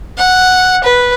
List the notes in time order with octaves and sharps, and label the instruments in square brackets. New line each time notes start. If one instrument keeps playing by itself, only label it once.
[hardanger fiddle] F#5
B4